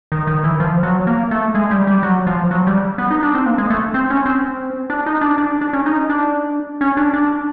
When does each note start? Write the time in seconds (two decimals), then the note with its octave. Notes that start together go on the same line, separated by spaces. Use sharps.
0.12 D#3
0.27 D#3
0.44 E3
0.60 F3
0.83 F#3
1.07 A#3
1.31 A3
1.55 G#3
1.71 G3
1.87 G3
2.03 F#3
2.27 F3
2.51 F#3
2.67 G3
2.98 B3
3.11 D#4
3.23 D4
3.35 C4
3.46 A#3
3.58 G#3
3.70 A3
3.94 C4
4.10 C#4
4.26 C4
4.90 D4
5.06 D#4
5.21 D4
5.38 D4
5.61 D4
5.73 C#4
5.86 D#4
6.10 D4
6.81 C#4
6.97 D4
7.14 D4